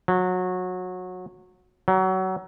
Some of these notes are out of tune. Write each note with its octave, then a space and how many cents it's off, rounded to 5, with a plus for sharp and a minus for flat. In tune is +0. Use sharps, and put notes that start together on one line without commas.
F#3 -20
F#3 +25